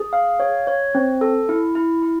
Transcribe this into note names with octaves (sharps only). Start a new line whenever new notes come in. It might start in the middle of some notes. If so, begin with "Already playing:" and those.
Already playing: G#4
F5
C#5
C#5
C4
A4
E4
E4
E4